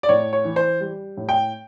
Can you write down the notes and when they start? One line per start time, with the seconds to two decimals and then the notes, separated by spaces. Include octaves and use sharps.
0.03 D5
0.09 A2 C#5
0.33 C#5
0.45 E3
0.56 C5
0.80 G3
1.17 A2
1.29 G5